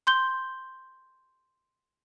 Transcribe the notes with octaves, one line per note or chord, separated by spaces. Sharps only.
C6 G6 G7